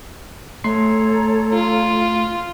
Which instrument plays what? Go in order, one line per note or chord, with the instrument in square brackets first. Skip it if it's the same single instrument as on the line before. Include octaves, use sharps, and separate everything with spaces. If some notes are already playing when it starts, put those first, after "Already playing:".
[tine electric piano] A3 C6 C7 [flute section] A4 C#5 A#5
[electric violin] F4